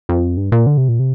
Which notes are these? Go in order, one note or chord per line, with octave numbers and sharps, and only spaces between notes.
F2
G2
A#2
D3
C3
A#2
C3